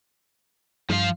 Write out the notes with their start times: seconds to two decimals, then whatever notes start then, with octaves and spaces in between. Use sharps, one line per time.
0.89 G2 F3 F5